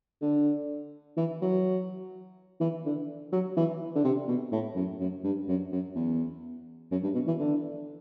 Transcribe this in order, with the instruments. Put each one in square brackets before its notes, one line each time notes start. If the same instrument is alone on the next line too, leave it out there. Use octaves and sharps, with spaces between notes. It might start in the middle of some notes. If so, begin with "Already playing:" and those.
[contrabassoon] D3
E3
F#3
E3
D3
F#3
E3
D3
C3
B2
A2
F#2
F#2
G2
F#2
F#2
E2
F#2
G2
B2
E3
D3